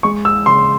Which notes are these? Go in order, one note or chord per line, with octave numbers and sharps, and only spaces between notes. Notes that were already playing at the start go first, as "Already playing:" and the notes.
G#3 C#6
E6
C#3 C6